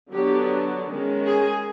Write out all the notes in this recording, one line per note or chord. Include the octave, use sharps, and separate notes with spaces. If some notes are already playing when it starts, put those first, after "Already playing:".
D3 F#3 B3 D4 G4
D#3 G#3 C#4
G#4